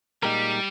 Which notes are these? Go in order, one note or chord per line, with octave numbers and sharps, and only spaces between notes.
A#2 G3 G#3 D#4 G4 A#4